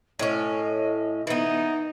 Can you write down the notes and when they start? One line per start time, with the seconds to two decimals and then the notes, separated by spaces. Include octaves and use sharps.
0.19 A2 C#4 D#5
1.27 E3 B3 D#4